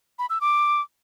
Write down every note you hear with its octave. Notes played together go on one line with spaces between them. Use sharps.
B5
E6
D6